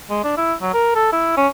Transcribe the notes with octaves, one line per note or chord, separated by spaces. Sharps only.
G#3
D4
E4
F#3
A#4
A4
E4
C#4